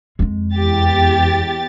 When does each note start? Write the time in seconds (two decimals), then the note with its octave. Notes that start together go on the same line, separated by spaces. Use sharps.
0.19 F2 G#3
0.54 E2 G4 A6